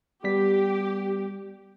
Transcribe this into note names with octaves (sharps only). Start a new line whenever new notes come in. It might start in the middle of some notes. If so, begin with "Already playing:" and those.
G3 B3 G4 B6